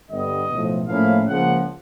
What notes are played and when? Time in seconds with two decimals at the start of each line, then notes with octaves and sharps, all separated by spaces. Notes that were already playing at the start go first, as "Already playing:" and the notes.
0.11 G2 D3 G3 B3 D#5
0.50 B1 A2 F3
0.88 A2 F3 A#3 C#4 E4 F5
1.26 C#2 C#3 F3 A#3 F#5